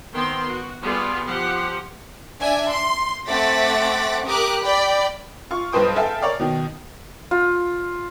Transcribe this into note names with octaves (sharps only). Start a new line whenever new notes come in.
D#3 B3 C4 G5 C6
F#4
G3 B3 F4 G#4
F3 G4 F#5
D4 E5 G#5
C6
A3 C4 F#5 D6 A6 B6
G4 A#4 D6 D#6 F#6
D5 G5 B5
F4 C#6
B1 G2 B4 C5 G5 D#6
G#4 A4 E5 F5 G5 A5
A#4 C#5 D5 F5
B2 D#3
F4